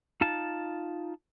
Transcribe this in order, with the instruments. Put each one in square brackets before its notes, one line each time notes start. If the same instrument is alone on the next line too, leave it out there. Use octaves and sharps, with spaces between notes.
[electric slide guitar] D#4 F4 A5